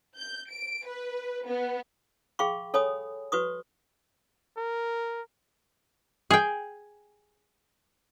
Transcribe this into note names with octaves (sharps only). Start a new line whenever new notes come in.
G6
D7
B4
B3
G#4 F5 G5 B5 C#6
A4 C#5 G#5 B5 D#6
F#4 B4 C#6 D#6
A#4
G#4 G5